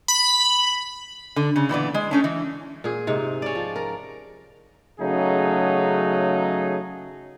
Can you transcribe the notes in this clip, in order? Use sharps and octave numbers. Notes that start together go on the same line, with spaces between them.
B5
D3
C#3
A#2 E3 B3 D5
G#3
A3 C#4 D4
E3
A#2 G#4
G#2 C3 D#4
C#4 D5
F3
A#4
C#3 F#3 A3 D#4 G#4